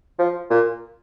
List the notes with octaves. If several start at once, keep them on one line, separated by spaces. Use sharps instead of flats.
F3
A#2